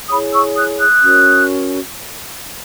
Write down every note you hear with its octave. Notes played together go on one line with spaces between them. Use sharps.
E4 G#4 C#5 B5 D#6
C#6 E6
D#6 F#6
D#6 F#6
C#4 F#4 A#4 C#5